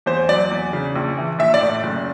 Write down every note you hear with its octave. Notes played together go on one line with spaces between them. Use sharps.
E2 C5
F#3 D5
E2
C#3
A#1
E3
A#1 E5
D5
A2
F#1